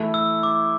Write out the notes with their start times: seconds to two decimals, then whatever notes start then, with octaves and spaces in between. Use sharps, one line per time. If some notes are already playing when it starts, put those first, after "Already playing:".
Already playing: E3 A3 E4
0.14 E6
0.43 D6